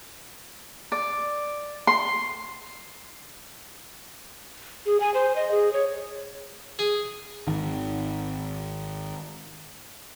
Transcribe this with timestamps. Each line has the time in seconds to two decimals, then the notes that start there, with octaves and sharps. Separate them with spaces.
0.92 D5
1.87 C6
4.86 G#4
5.00 G#5
5.14 C5
5.36 D#5
5.51 G#4
5.73 C#5
6.79 G#4
7.47 G#1 D#3